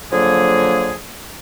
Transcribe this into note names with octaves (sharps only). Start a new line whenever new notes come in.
D3 F3 F#3 A#3 G#4